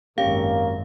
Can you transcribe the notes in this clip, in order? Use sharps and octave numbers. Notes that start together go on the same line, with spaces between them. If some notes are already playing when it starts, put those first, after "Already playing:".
G#1 F#2 A#3 C#4 G4 F5